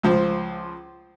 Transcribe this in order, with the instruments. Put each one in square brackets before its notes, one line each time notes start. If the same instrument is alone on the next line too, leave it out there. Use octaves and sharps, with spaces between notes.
[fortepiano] C#2 F3 C5